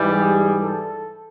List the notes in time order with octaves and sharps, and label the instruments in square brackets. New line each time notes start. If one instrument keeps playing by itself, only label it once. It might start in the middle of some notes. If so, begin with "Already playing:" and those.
Already playing: [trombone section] G#2 E3 G3
G#4
A4